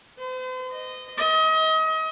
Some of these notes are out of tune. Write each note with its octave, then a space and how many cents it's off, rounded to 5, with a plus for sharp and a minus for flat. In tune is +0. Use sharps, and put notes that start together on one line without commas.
C5 -40
D#5 -10
D#5 +35